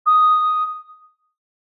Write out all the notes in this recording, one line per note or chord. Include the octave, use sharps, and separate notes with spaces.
D#6